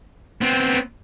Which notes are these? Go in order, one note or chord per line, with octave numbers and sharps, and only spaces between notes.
B3 C4